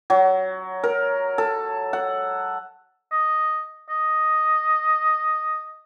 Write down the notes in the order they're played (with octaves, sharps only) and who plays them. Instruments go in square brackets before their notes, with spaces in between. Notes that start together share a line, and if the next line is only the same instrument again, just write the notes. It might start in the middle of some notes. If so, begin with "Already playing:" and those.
[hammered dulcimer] F#3
A#4
A4
F#5
[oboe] D#5
D#5